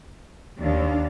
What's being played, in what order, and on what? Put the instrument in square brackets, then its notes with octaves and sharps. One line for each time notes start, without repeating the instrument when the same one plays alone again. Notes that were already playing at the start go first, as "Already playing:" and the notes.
[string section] D#2 [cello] D4 F5